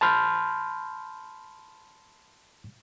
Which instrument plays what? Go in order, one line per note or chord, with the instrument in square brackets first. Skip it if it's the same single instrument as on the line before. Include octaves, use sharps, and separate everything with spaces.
[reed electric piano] A5 B5 C6 F6 G6